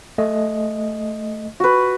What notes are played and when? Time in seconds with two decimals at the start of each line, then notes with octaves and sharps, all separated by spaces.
0.18 A3 D#5
1.60 F#4 B4